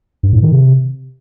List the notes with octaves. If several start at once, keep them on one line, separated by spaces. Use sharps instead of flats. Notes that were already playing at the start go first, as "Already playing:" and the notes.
G2
A2
D#3
C3